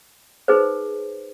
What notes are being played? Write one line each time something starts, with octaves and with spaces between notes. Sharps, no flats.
D#4 G#4 B4 C5